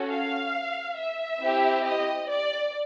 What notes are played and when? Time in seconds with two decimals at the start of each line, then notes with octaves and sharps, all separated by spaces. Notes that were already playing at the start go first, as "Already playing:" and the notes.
Already playing: C#4 F#4 A4
0.09 F5
0.97 E5
1.41 C4 E4 G4
1.85 D#5
2.29 D5